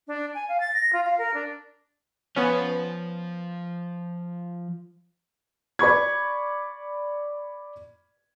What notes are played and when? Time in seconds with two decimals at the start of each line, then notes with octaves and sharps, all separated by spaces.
0.07 D4
0.34 G#5
0.48 F5
0.60 A6
0.73 A#6
0.92 F4
1.05 F5
1.18 A#4
1.34 D4
2.36 F3 B3 C#4 F4
5.79 D5 B5 C#6 G#6